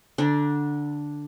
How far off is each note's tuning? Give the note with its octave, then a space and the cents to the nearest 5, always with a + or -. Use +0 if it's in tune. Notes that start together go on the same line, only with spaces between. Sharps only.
D3 +0 D4 +0 A#5 +45